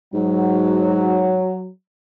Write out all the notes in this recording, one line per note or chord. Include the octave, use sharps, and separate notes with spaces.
G#2 F#3